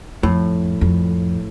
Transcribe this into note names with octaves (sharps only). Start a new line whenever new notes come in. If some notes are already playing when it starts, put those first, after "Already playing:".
F2 A2
F2